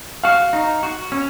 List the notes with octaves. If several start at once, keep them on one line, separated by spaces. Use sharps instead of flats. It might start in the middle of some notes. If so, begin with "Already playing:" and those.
F#4 F5
D#4
F#4
C#4